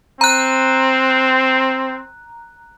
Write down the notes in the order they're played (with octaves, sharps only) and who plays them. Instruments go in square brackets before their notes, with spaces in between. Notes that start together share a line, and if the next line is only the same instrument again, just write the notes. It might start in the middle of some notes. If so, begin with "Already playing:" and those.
[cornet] C4 [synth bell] A#5 F#6